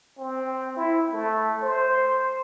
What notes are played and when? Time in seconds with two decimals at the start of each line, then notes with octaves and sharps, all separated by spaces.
0.19 C4
0.77 E4
1.14 A3
1.62 C5